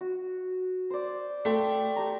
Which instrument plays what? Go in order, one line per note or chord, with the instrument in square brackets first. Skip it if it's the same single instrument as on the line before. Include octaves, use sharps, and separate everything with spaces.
[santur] F#4
C5 D5
[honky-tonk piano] A3 [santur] F5 G5 C6
[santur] G4 A5 A#5